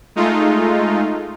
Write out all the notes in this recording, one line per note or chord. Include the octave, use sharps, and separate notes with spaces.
G#3 A3 D#4 F4